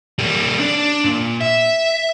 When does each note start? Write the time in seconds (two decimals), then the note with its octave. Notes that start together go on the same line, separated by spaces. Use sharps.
0.19 G3 A#3
0.59 D4
1.04 A#2
1.41 E5